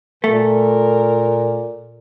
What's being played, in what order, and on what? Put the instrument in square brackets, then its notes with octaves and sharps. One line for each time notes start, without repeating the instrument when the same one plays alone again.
[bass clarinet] A#2 [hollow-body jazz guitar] A3 [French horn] A#4